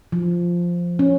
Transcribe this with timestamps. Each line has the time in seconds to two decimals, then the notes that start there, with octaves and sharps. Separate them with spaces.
0.12 F3
0.99 C#4